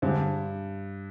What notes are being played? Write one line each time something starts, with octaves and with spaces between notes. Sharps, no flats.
G2 D3 G#3 C4